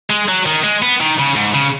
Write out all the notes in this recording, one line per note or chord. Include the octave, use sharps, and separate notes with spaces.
G#3
F#3
D#3
G#3
B3
D#3
C#3
G#2
C#3